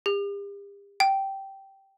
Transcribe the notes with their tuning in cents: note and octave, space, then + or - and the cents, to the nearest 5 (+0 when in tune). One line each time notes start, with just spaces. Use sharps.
G4 +40
G5 -10